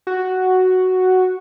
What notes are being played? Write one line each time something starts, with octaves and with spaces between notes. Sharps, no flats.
F#4